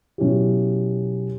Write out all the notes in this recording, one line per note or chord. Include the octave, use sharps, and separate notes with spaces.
B2 F#3 C#4 E4 G4